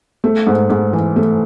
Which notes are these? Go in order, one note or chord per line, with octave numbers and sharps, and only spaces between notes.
A3
G#2
G#2
E3
A3